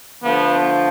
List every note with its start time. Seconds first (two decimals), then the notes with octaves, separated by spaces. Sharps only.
0.22 D3 F3 A3 B3